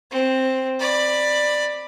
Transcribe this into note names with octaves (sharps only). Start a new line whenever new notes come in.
C4
D5 B5